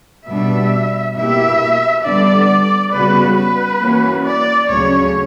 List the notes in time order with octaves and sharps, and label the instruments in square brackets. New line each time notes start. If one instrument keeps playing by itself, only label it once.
[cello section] B2 G3 B3 D4 [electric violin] E5
[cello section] B2 A#3 E4 G4 [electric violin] E5
[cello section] D3 G3 B3 D4 [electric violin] D5
[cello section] C#3 G3 B3 F#4 [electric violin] B4
[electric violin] B4
[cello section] E3 A#3 C#4 F#4
[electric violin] D5
[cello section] D2 C#3 F#3 C#4 [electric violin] C#5